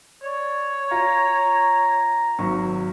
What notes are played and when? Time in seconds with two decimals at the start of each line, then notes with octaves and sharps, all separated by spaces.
0.23 C#5 D5
0.91 F4 A#5
2.39 G#1 F#3 C#6